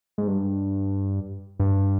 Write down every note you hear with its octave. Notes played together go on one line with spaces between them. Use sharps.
G#2
G2
G2